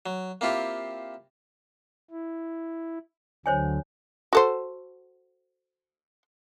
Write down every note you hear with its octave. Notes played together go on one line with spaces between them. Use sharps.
F#3
A#3 C4 E4 F4 G4
E4
D2 D3 F#3 C5 C#5 G#5
F#4 A4 C5